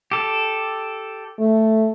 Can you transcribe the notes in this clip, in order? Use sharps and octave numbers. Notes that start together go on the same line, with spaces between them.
G4 A4
A3